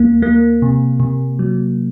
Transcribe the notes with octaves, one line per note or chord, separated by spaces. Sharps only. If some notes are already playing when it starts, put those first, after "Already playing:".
Already playing: D#2 A#3
A#3
C3
C3
F#3